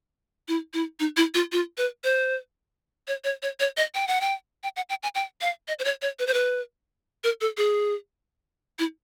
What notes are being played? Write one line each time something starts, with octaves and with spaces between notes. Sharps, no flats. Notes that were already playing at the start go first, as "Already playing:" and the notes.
E4
E4
D#4
E4
F4
F4
B4
C5
C#5
C#5
C#5
C#5
D#5
G5
F#5
G5
G5
F#5
G5
G#5
G5
F5
D#5
C5
C#5
C#5
B4
C5
B4
A#4
A4
G#4
E4